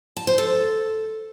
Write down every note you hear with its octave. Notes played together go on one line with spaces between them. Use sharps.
A5
C5
A4